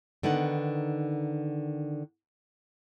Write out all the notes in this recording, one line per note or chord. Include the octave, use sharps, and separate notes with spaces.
D3 D#3 B3 D#4 F#5